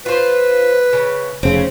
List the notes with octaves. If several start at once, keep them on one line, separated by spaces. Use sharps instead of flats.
F4 B4 C5
C#3
F1 C#3 C4